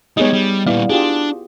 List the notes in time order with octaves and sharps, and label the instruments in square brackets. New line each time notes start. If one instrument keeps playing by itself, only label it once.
[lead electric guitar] G3 G#3 [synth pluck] B3 D#5 [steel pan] D#4 G#4 C#5
[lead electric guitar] G3
[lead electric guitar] A#2 G3 [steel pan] B3 [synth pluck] E4 D5 F5
[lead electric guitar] D4 [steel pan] F4 G4 G#4